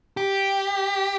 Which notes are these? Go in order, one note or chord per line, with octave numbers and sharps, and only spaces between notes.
G4